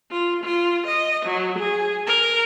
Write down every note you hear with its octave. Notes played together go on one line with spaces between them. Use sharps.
F4
F4
D#5
F#3
G#4
A#4